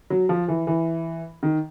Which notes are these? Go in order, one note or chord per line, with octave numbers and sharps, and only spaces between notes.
F#3
F3
E3
E3
D#3